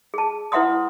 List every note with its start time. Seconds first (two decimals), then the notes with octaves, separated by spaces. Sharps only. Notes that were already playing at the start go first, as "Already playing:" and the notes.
0.14 G#4 A5
0.52 E4 B4 E5 F#5 C6 D#6